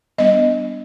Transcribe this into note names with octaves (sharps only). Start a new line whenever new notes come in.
G3 B3 D4 D#5